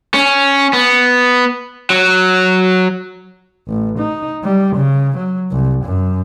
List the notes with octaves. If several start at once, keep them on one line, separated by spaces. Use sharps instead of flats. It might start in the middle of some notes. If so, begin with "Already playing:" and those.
C#4
B3
F#3
A1
D#4
G3
C#3
F#3
C2
F#2